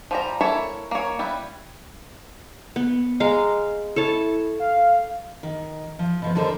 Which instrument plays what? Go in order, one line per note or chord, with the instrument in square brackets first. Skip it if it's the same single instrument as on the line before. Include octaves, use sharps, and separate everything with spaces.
[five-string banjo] F3 G3 A#5
A#3 E4 A4 C#5 E5
A#3 C#5
G3 B3 E4
[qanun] B3
G#3 F5 A#5
[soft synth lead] E4 [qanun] A4 C#5 A5
[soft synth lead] F5
[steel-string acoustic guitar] D#3
F3
B2 F3 B3
D3 D#3 G3 A4 A#4 C5